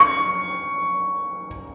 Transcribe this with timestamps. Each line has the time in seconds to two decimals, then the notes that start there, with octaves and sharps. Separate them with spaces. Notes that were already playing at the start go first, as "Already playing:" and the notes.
Already playing: C#6